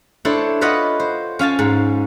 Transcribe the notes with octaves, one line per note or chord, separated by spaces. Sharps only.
D4 E4 A4 C5 C#5
F4 B4 C#5 D#5 F#5
C5
C#4 F5 G#5 A5
G#2